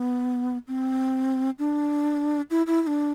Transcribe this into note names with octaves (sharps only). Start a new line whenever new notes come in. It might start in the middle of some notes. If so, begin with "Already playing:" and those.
Already playing: B3
C4
D4
E4
E4
E4
D4